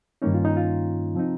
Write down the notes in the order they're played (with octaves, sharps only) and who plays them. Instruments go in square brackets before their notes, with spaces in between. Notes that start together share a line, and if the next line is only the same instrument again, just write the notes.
[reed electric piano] G2 D#3 A#3 C#4 D#4
F4
D#4
F4
C3 F3 C4 D#4